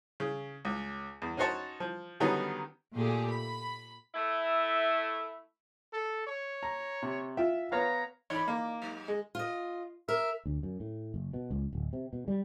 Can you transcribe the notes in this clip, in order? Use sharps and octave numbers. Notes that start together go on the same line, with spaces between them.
C#3
C#2
E2
C#4 D#4 F#4 C5 C#5 A5
F3
D3 D#3 F#3 G3 B3 C#4
A#2 A3 G4 G#4
B5
A3 E4
A4
C#5
A#5
C3
F4 E5 G5
B3 C#5 F5 A#5
E3 D#4 C#5 D5 B5
A#3
G#2 F#3
G#3
F4 D#5
A#4 E5
D2
F#2
A2
F#1
B2
C#2
D1
C3
B2
G3